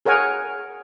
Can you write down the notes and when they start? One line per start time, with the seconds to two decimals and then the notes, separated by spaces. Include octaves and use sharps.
0.05 G#4 A#4 C#5 F#5 G#5